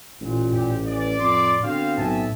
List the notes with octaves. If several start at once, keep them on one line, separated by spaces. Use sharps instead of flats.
A1 A#2
A2 G4
E3 D5
F2 C6 D6
D3 B3 C4 F#4 C5 F5
B1 A2 E5 G#5 A5